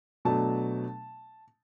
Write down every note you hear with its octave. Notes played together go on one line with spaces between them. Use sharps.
B2 F#3 A3 D4 A5